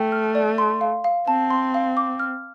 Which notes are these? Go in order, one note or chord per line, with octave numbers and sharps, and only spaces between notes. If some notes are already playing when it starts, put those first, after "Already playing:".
Already playing: A3 G5
F6
D5
C6
F5
F5
C4 A5
C6
F5
D6
F6